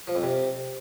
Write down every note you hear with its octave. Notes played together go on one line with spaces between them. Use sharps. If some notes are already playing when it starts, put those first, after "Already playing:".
F3
F2
C3